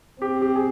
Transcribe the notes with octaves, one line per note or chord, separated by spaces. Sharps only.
C4 G4
G4
G#4